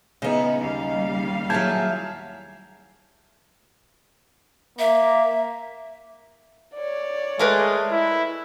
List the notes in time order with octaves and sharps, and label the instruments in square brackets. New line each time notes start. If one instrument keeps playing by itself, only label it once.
[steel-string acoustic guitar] C#3 D#4 [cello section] B3 [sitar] E4 D#5
[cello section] D#2 G3 F5
[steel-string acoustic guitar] F#3 E4 [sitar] C#4 F4 G#4 [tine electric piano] A5 G6 G#6
[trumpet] A#3 [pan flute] E5
[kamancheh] C#5 D5
[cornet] G#3 [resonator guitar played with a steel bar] A3 A#4 B4
[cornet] E4